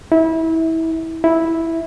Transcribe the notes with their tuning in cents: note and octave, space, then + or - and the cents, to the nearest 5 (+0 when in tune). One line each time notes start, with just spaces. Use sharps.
E4 -25
E4 -5